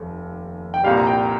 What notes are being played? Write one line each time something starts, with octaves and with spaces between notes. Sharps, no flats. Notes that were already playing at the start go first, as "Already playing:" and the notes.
Already playing: F1 D#2
G5
C2 A#2 G3 F5
A#5
G5